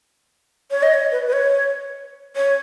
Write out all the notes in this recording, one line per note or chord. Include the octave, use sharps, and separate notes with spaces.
C#5
D#5
C#5
B4
B4
C#5
C#5